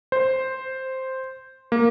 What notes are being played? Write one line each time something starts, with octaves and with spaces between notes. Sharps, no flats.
C5
A#3